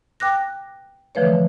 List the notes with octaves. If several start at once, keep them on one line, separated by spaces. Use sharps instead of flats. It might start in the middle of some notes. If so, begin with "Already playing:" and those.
G5 D6 F#6 A#6
D3 E3 F3 A3 B4 C#5